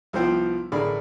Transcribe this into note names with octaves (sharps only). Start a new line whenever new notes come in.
C2 F3 B3 C5 G5
A1 D3 G#4 A#4 D5 B5